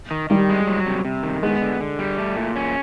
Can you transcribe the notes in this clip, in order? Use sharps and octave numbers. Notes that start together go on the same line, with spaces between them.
D#3
D#3 G3
G#3
F#3
C3
C3
D#3
G#3 B3
D3
D3
G3
A3
A#2
C#4